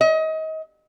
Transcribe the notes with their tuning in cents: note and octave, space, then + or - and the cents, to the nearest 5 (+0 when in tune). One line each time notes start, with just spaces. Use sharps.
D#5 +30